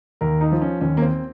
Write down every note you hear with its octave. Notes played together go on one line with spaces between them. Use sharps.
D#2 A#4
D#4
F3
C#4
D#2 C#4
A#3
C4